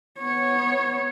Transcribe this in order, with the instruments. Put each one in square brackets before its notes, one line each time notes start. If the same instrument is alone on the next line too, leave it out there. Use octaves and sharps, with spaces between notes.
[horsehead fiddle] B3 C#5